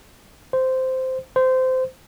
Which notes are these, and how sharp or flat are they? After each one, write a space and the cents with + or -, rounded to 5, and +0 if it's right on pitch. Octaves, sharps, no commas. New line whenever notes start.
C5 -10
C5 -20